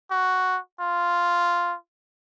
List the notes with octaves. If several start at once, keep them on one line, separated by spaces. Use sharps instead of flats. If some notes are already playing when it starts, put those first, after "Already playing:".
F#4
F4